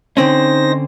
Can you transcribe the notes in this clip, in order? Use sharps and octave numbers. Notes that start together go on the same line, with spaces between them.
D3 C4 C#4 D#4 C5 A#6